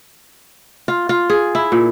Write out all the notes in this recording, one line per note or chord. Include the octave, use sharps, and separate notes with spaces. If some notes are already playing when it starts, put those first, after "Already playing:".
F4
F4
G#4
E4
A#2